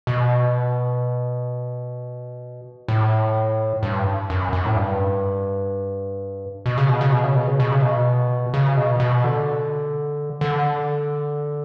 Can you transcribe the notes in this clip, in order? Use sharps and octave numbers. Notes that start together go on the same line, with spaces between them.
B2
A2
G2
F#2
F#2
A2
G2
B2
C#3
B2
C#3
B2
C#3
B2
C#3
B2
C#3
B2
C#3
B2
B2
D3
D3